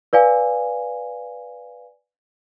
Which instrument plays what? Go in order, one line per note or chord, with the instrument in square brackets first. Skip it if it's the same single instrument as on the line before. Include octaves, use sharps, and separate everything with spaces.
[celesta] B4 D5 F5 G#5